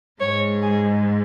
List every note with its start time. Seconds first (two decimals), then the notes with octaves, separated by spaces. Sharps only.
0.20 G#2 G#3 C#5
0.62 G#4